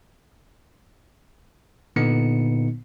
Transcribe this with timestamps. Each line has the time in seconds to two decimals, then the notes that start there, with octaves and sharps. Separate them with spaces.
1.96 A#2 D3 B3 D#4 C#7